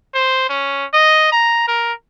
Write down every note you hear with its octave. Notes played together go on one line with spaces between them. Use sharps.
C5
C#4
D#5
A#5
A#4